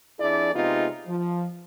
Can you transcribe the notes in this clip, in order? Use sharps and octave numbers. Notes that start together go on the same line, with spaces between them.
F2 D4 E4 G#4 D5
C3 G#3 B3 D#4 F4
F3